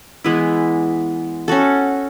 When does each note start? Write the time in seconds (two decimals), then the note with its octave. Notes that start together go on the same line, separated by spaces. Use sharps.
0.24 E3 G#3 B3 E4
1.48 C#4 F#4 A4